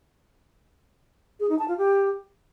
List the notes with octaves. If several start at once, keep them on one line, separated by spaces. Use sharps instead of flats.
G#4
D#4
A5
F4
G4